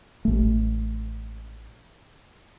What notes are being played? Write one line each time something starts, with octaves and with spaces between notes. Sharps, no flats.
A1 A3